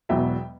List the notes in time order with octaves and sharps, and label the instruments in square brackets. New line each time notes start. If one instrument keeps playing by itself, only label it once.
[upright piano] E1 E2 B2 F#3 E5 G5